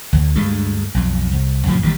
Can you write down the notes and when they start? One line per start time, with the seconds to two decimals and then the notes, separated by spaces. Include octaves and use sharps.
0.13 D2
0.36 D2 G2 G#3 A3
0.94 B1 F2
1.31 C2
1.66 F2 A2 C#3 F3
1.82 A1 D#3 E3 G3